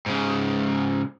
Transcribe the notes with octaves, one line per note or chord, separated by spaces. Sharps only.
G#2 C#3